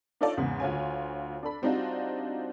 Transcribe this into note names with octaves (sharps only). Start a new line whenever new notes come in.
D4 D#4 F4 A4 C#5 D5
E2 G#2 C#3
D2 F4 C#5 G#5
D4 A4 B5
G3 C4 D4 D#4 F4 F#4